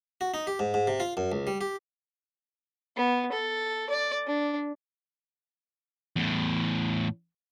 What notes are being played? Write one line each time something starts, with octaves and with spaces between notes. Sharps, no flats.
F#4
D#4
G4
G#2
G#2
C3
F4
F#2
C#2
G3
G4
B3
A4
D5
D4
E2 A2